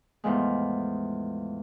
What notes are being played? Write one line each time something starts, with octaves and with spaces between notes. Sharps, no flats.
E2 A2 F3 G#3